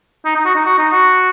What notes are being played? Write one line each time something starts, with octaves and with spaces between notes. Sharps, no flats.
D#4
D#4
F#4
D#4
F#4
D#4
F#4